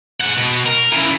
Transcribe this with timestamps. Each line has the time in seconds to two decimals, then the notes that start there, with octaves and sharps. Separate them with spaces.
0.20 G#3 F#5
0.37 B2
0.66 A#4
0.92 C#3 E3